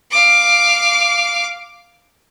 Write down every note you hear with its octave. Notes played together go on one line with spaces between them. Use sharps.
F5 D6